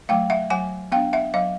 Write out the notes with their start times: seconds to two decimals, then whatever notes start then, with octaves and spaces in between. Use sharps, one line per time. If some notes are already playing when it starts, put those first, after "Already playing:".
0.09 F#3 A3 F5 G5
0.30 E5 F#5
0.50 F#3 F#5 G#5
0.92 B3 D4 F5 G5
1.13 E5 F#5
1.34 F#3 D#5 F5